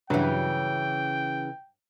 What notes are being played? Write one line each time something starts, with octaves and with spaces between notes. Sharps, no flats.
G2 C#3 E3 F#3 G5